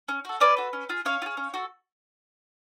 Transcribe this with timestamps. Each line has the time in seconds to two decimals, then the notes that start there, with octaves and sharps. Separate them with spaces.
0.08 C#4
0.25 F#4 A4
0.40 C#4 B4 D5
0.57 F#4 A4
0.73 C#4
0.89 F4 G#4
1.05 C#4 C#5 F5
1.22 F4
1.26 G#4
1.37 C#4
1.54 F#4 A4